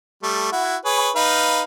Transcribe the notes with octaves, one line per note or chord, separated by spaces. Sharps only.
G3 A3
E4 F#4
G#4 B4 C#5
D#4 B4 F5